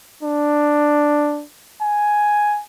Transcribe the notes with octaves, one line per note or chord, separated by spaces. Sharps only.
D4
G#5